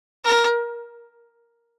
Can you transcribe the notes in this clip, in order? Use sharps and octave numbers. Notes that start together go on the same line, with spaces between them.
A#4